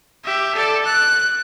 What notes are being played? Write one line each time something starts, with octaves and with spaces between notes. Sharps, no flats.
G4 E5
A4 D5
F#6